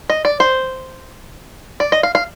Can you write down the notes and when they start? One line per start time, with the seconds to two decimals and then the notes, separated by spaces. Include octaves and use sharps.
0.10 D#5
0.25 D5
0.40 C5
1.80 D5
1.92 D#5
2.03 F5
2.15 F5